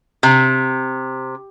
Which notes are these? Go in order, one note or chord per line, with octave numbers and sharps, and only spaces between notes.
C3